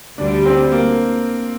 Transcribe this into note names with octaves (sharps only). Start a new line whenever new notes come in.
D2 D3 G3 D4
C4
A#3